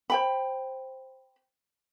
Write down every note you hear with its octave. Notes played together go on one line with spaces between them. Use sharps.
C5 G5 B5